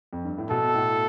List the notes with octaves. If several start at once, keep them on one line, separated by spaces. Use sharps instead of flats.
F2
G2
A2
B2 A4
A2